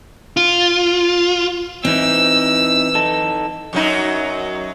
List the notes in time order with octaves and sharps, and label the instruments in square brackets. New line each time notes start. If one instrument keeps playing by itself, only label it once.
[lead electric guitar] F4
[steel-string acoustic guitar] E3 [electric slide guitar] C4 D#4 E4 [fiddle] E6
[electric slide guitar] D#4 A4
[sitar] F#2 F#3 D#4